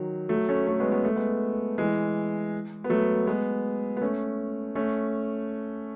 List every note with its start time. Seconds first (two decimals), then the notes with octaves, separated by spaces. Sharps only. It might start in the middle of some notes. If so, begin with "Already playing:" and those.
Already playing: D#3 F#3
0.29 F#3 A3
0.49 A3 C#4
0.67 A3 C#4
0.80 G#3 B3
0.92 B3
1.04 A3
1.16 G#3 B3
1.78 E3 G#3
2.84 B3
2.89 F#3 A3
3.27 G#3 B3
3.97 B3
4.01 A3 C#4
4.75 A3 C#4